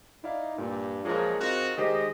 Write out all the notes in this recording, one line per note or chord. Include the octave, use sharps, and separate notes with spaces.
D#4 E4 D5 F5
G2 A#2
F#2 A#2 F3 G#3 G#4 A#4
D#3 C4 F4 F#4
D#3 G#3 G4 C5 D#5